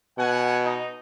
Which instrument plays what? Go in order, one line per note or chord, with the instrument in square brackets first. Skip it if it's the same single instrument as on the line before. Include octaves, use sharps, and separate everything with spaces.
[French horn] B2 [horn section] F#5 G#5
[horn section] D#4